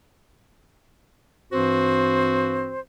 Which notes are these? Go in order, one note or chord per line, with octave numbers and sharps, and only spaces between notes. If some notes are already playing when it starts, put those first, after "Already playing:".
G2 E3 C4 F#4 C5